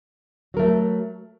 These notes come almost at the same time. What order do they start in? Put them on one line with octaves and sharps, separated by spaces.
F#3 A#4 A3